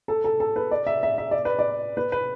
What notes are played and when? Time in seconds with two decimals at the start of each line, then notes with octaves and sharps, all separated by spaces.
0.08 A4
0.24 A4
0.40 A4
0.56 B4
0.71 D5
0.87 E5
1.03 E5
1.18 E5
1.31 D5
1.45 B4
1.59 D5
1.97 B4
2.12 B4